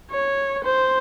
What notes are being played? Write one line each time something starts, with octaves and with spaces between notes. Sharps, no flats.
C#5
C5